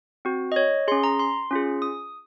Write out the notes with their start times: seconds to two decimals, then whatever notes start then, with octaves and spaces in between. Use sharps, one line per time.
0.25 C4 F#4
0.52 D#5
0.56 C#5
0.88 G#4 C6
0.92 C#4
1.04 A#5
1.19 C6
1.51 C#4 F4 G#4
1.82 D#6